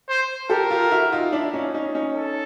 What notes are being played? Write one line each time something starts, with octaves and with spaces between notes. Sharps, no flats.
C5
G4 A4 A#4
F4 G4
E4 F#4
D#4 F4
D4 E4
C#4 D#4
C#4 D#4
C#4 D#4
A4